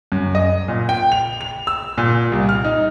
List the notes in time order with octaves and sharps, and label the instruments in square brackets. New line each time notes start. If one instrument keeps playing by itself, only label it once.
[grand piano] F#2
D#5
A#2
G5
F7
F7
E6
A#2
C2
F6
D#4